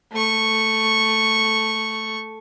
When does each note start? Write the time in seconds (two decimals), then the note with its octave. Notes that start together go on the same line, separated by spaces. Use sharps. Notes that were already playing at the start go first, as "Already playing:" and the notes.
0.12 A3 C#6